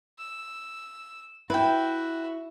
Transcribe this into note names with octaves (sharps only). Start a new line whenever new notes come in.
E6
E4 F#4 B4 E5 G5